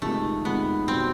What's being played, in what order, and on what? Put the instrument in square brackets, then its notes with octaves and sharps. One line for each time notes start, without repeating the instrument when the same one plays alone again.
[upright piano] F2 C3 D#3 G#3 [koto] A3
[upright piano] F2 C3 D#3 G#3 [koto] B3
[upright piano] B2 G3 [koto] C4